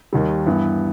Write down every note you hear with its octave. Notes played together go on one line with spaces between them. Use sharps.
D#2 D#3 G3
G2 E3 B3